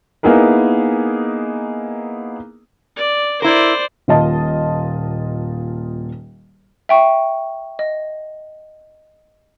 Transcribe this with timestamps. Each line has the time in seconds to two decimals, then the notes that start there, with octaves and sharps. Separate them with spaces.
0.23 A#3 B3 D#4 E4 G#4 A#4
2.97 D5
3.42 E4 A#4 C5 D5
4.08 D#1 A#2 F4 D#5 A5
6.89 E5 G5 C#6
7.79 D#5